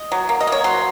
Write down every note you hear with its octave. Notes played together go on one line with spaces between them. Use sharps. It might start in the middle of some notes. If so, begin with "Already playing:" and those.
Already playing: D#5
F#3
A#3
D#5
A#3 C#5
F#3 C5